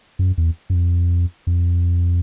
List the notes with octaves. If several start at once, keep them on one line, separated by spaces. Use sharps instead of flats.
F#2
E2
F#2
F2
F2